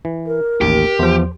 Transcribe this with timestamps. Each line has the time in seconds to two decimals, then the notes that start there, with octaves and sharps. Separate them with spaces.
0.05 E3
0.26 A#4
0.61 A1 D#2 G4
0.99 E2 F3 C5